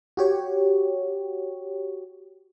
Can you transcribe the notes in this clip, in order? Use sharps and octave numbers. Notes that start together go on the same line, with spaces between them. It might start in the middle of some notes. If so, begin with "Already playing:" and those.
F#4 G4 C#5